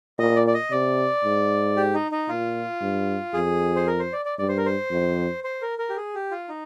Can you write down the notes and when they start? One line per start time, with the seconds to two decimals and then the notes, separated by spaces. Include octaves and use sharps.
0.19 A#2 D#5
0.36 D5
0.47 D5
0.54 D#5
0.71 C3 D5
1.24 G#2
1.76 G4
1.94 D#4
2.11 D#4
2.29 A#2 F4
2.81 G2
3.34 F2 G#4
3.76 C5
3.87 A#4
3.99 C5
4.13 D5
4.25 D5
4.38 G2 D5
4.48 C5
4.57 A#4
4.66 C5
4.91 F2
5.44 C5
5.62 A#4
5.78 A#4
5.89 G4
5.96 G#4
6.15 G4
6.31 F4
6.49 D#4